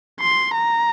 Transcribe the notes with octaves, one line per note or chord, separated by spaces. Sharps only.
C6
A#5